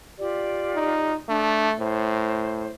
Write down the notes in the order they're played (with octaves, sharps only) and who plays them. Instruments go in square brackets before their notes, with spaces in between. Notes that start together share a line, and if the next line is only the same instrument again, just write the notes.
[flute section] F4 G4 D5
[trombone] D#4
[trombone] A3 [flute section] D4
[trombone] A2 [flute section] C5